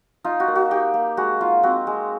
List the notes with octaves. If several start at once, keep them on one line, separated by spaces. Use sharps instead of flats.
D#4 F4
F#4
A#3
F#4
D#4 G4
A#3
G#3 F#4
D#4 F4
C4 F#4
G#3